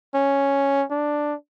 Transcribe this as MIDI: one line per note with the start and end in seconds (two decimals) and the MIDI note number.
0.14 0.84 61
0.90 1.35 62